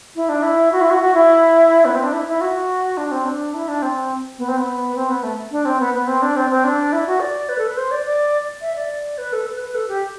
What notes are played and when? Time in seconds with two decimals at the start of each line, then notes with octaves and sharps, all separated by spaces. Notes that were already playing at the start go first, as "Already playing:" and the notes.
0.16 E4
0.29 D4
0.43 E4
0.72 F#4
0.81 E4
0.90 F#4
1.01 F#4
1.14 E4
1.85 B3
1.94 C4
2.03 D4
2.13 E4
2.28 E4
2.41 F#4
2.97 D4
3.11 C4
3.25 D4
3.54 E4
3.68 D4
3.82 C4
4.38 B3
4.48 C4
4.57 B3
4.95 C4
5.09 B3
5.23 A3
5.52 D4
5.65 C4
5.80 B3
5.94 B3
6.07 C4
6.22 D4
6.36 C4
6.50 C4
6.64 D4
6.93 E4
7.07 F#4
7.20 D5
7.49 B4
7.58 A4
7.67 B4
7.77 C5
7.91 D5
8.05 D5
8.62 E5
8.76 D5
9.18 B4
9.33 A4
9.47 B4
9.61 B4
9.75 A4
9.88 G4